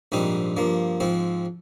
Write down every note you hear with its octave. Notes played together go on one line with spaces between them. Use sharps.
A#1 G#2 G3 C4 D#4
G2 F3 A#3
G#2 F3 C4